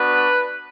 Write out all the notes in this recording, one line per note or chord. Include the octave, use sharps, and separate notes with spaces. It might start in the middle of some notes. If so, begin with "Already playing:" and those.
Already playing: B3 D4 F#4 B4